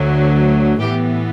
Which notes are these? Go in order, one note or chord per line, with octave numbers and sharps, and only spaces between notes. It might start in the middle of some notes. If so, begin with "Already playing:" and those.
Already playing: D2 D3 F#3
A2 E3 B3 G4